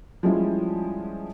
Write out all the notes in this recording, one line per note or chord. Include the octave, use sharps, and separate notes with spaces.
F3 G3 G#3 C#4 E4 F4